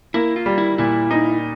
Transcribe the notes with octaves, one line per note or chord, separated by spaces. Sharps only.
A#3 E4
F4
G3
E4
A#2 E4
D#4